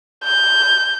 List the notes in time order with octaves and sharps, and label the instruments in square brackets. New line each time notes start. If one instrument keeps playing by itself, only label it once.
[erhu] G6